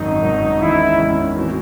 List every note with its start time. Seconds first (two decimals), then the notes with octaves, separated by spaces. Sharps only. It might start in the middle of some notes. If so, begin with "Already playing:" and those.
Already playing: G#1 F#2 D#3 D#4
0.22 G#1 F#2 D#3
0.60 E2 D#3 G#3 C#4 E4
0.98 E2 D#3 G#3 C#4
1.36 A2 E3 C4 F#4